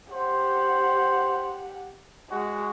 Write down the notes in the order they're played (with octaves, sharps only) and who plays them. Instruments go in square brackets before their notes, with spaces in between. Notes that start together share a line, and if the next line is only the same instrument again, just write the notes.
[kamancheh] G4 F#5 [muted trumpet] C5
[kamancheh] G#3 [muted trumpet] F#4